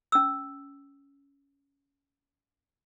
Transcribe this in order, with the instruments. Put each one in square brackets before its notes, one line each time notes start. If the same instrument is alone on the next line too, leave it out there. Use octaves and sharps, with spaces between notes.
[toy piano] C#4 E6